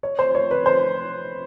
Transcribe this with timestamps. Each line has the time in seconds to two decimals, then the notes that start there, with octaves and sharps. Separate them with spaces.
0.03 C#5
0.19 C5
0.35 C#5
0.51 B4
0.66 C5